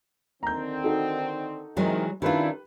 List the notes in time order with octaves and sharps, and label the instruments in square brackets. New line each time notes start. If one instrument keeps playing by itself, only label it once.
[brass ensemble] D3 D#3 C4 [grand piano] A#5 G6
[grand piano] D#4 F#4 A4
[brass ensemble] C3 D#3 [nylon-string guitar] E3 F#3 G#3
[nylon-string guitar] D#3 F4 [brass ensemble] C#4 D4 E4 [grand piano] G4 B4